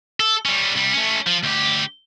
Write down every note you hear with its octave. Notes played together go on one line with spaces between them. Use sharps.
A4
G3 C#4
C2 G3
A3 C#4
F3
D2 G4